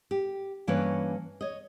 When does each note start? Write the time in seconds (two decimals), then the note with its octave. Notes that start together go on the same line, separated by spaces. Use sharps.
0.11 G4
0.67 G2 E3 A#3 C#4 B4 C#5
1.41 C#5 D#5